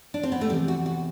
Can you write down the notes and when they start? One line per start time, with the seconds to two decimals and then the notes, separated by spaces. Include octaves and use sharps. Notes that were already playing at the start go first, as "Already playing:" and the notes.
0.14 D4
0.23 C4
0.32 B3
0.41 A3
0.49 E2 C3 E3 G3
0.68 F#4
0.86 F#4